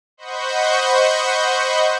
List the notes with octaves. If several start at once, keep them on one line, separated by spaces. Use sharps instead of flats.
C5 D#5 F#5 B5 C#6 G6